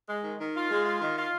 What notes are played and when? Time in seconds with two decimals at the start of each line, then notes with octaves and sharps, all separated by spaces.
0.08 G#3
0.23 D#3
0.39 D#3
0.55 F4
0.70 G#3
0.85 F4
1.01 D#3
1.17 F4